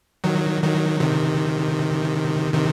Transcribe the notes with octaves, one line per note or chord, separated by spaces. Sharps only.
D#3 F#3
D#3 F#3
C3 D#3
C3 D#3